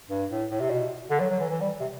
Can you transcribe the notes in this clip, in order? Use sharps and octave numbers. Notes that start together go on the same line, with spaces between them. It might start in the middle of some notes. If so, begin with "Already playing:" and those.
G2
A2
A2
C3
B2
D3
F#3
F#3
E3
E3
G3
C3